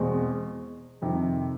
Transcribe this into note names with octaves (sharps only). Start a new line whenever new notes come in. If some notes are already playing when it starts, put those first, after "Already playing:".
Already playing: E2 B2 G#3 C4
F2 C3 D#3